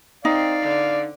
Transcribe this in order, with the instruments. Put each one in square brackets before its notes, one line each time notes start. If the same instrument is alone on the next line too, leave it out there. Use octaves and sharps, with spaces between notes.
[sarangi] C4 [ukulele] D#4 [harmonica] D5 F5
[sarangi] D3